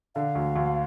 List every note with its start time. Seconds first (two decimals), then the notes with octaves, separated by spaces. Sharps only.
0.15 D3 F5
0.35 D2
0.56 D2